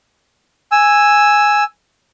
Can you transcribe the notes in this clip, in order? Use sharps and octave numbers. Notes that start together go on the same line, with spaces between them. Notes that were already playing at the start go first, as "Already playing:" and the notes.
G#5 E6